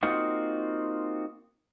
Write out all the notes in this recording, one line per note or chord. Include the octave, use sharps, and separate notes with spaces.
A#3 C4 D#4 F4 F#4